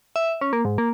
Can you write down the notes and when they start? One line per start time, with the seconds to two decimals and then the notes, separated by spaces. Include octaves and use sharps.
0.16 E5
0.41 C#4
0.53 A#3
0.65 G#2
0.78 A#3